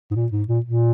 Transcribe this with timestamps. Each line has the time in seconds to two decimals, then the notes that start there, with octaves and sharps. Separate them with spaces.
0.11 G#2
0.15 A#2
0.32 G#2
0.48 A#2
0.64 A#2